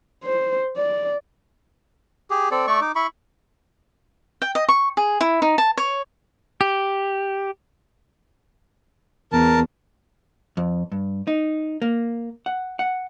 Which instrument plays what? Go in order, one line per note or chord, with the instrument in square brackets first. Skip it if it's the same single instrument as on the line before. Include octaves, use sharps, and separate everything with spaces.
[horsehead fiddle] C5
D5
[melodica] G4 G#4
C4 A4 D5
A3 D5 C#6
D#4 D6
E4 B5 C#6
[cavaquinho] G5
D#5
C#6
G#4
E4
D#4
A5
C#5
[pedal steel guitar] G4
[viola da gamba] E2 [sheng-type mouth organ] A#4 A5
[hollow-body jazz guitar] F2
G2
D#4
A#3
F#5
F#5